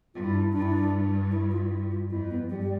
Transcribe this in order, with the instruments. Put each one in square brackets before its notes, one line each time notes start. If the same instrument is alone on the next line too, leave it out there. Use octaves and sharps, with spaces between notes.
[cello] G2 [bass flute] F4
[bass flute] E4
D4
E4
[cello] G2 [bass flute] D4
[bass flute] E4
D4
E4
F4
E4
F4
[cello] F2 [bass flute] E4
[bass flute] B3
[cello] G2 [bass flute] G3
[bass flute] G3